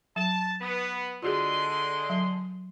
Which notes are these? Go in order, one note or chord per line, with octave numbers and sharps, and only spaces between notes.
F#3 A5
B3
D3 G#3 F4 F#4 G#4 C6
F#3